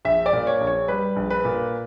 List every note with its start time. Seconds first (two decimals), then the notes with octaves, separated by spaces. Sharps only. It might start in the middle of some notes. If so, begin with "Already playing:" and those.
0.05 A#1 E5
0.26 D5
0.33 A#2
0.47 C#5
0.61 A#1
0.67 C#5
0.88 G3 B4
1.16 A#1
1.30 B4
1.45 A#2